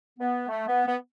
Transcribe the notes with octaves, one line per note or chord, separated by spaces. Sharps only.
B3
A3
B3
B3